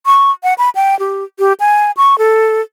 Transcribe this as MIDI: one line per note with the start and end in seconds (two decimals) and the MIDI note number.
0.06 0.31 85
0.43 0.54 78
0.58 0.69 83
0.75 0.98 79
0.99 1.24 67
1.39 1.53 67
1.60 1.91 80
1.97 2.18 85
2.18 2.61 69